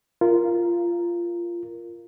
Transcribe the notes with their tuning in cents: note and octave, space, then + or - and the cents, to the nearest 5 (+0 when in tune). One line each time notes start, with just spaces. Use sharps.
F4 -15 A#4 +0